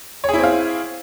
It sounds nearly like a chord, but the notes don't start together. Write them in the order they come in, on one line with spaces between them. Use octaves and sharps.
C#5 G#4 E4 C4 F5